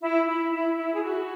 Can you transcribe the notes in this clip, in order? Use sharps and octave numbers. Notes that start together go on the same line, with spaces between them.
E4
E4
E4
E4
G#4
F#4